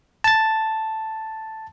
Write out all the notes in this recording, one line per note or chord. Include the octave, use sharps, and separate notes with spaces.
A5 A6